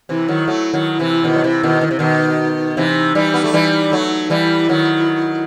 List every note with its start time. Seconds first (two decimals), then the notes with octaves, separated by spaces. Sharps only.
0.09 C3 E3 E4
0.28 D#3 F#3
0.48 F#3 A3
0.74 D#3 F#3
0.99 C3 E3
1.24 B2 D#3
1.35 F#3
1.44 C3 E3
1.63 B2 D#3
1.81 D#3
1.91 C3
1.99 B2 D#3 D#4
2.77 C3 E3
3.15 E3 G3
3.34 B3
3.44 A3
3.53 E3 G3
3.92 F#3 A3
4.30 E3 G3 E4
4.69 D#3 F#3